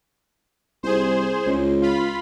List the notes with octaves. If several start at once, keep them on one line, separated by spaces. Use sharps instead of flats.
C2 G#4 C5
C#2
F4 B5